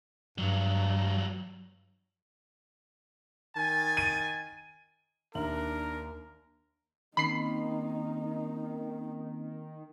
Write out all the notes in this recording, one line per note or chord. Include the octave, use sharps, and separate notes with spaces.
G2 F#3 G3
D#3 G#5 A6
D#7
D#2 D4 A#4 E5 F#7
D#3 A#3 C4 C#4 D#4 B5 C7